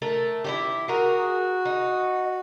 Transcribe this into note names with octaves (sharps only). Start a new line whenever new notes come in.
A3 A4 A#4
E4 F#4 G4
F#4 G#4 A#4
D#4